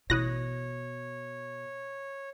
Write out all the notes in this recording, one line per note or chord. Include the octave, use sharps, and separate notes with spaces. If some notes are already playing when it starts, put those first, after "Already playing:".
A1 B2 E4 C#5 D#6 F#6 A#6